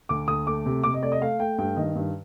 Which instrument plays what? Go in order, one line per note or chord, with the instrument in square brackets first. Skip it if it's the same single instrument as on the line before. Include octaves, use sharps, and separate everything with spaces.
[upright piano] D2 D6
D2 D#6
A3 D6
C3
C3 D6
D#5
A3 D5
D#5
A3 F5
A3 G5
G2 G5
D#3 D#5
G2